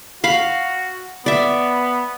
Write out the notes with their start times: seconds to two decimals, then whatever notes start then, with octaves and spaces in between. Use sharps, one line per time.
0.24 F#4 F5 B5
1.26 B3 D5 E5